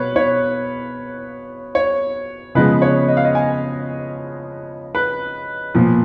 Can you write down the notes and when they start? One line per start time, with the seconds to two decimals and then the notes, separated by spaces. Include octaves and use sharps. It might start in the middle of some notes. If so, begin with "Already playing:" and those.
Already playing: B2 B3 B4 C#5 F5
0.16 C#5
1.75 C#5
2.55 C#3 F3 G#3 B3 B4
2.82 C#5
3.08 D#5
3.17 F5
3.25 D#5
3.35 G#5
4.95 B4
5.74 A#2 F3 B3